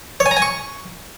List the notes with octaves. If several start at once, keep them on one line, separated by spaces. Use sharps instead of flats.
C#5
G#5
A#5
G#5
C#6